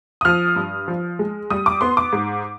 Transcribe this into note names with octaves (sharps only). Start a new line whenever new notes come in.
D#6
F3 F6
G2
F3
G#3
G3 D#6
D6
B3 C6
D6
G#2